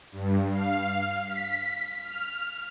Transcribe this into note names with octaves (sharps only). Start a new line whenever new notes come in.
G2
F5
B6
F6